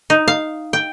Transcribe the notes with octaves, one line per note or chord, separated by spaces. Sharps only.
D#4
F5
G5